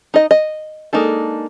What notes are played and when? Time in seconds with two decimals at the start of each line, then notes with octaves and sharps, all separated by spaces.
0.14 D#4 D#5
0.31 D#5
0.93 G#3 A#3 D4 D#4 A4